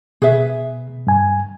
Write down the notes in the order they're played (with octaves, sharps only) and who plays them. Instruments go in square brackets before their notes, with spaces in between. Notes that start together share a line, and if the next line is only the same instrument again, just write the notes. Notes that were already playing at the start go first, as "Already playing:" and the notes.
[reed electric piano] B2 [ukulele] G#4 B4 E5
[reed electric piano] G2 G#5